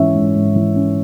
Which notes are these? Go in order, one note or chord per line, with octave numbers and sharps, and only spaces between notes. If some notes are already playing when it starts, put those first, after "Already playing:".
Already playing: G#2 E3 C#4 C#5 E5
G#2
G#2
E3
C#4